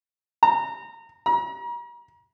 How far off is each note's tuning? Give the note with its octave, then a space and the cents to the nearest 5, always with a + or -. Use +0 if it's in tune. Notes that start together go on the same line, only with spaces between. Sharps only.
A#5 -25
A#5 +40